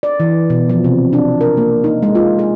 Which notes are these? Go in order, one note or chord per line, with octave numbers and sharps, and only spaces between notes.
D5
E3
B2
F3
C3
D4
A#4
A#3
D#4
G#3
F4
G#4